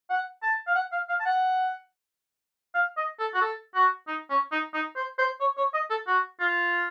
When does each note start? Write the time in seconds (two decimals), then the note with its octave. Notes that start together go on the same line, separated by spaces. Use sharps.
0.10 F#5
0.43 A5
0.67 F5
0.75 F#5
0.92 F5
1.09 F5
1.20 A5
1.25 F#5
2.74 F5
2.97 D#5
3.19 A4
3.34 F#4
3.41 A4
3.75 F#4
4.07 D#4
4.30 C#4
4.52 D#4
4.74 D#4
4.96 C5
5.18 C5
5.40 C#5
5.57 C#5
5.74 D#5
5.90 A4
6.07 F#4
6.40 F4